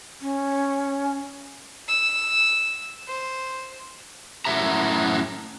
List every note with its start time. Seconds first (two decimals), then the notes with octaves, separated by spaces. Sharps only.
0.22 C#4
1.88 E6
3.08 C5
4.45 F#2 A2 F#3 E5 A#5